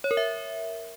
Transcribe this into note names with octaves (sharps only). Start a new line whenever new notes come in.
C#5
A#4
E5